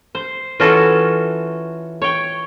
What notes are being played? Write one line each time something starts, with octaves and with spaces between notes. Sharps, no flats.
C5
E3 C#4 F4 F#4 A4
C#5 G5